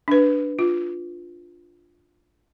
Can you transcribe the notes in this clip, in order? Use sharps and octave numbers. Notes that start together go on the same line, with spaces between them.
D4 B4
F4